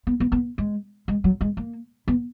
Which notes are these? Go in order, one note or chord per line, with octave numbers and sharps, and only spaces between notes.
B3
B3
B3
G#3
G#3
F#3
G#3
A#3
B3